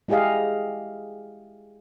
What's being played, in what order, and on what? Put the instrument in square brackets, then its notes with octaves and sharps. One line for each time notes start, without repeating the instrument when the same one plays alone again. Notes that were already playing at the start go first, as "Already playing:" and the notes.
[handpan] G#3 E4 G4 G#4 D#5 F5